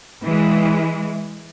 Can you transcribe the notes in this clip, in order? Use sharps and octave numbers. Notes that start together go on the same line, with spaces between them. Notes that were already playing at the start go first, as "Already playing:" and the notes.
E3 G#3